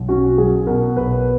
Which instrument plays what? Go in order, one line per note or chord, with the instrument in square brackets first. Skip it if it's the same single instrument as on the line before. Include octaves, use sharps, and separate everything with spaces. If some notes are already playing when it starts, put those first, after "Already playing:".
Already playing: [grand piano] B1
[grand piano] C#4 [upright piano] F#4
[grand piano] F#3 [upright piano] G#4
[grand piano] B2 [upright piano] A#4
[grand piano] B1 [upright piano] B4